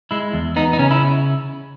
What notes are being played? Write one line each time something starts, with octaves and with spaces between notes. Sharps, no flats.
G#3 E4
E2
B3 D#4
D#4
C#3 C#4
E4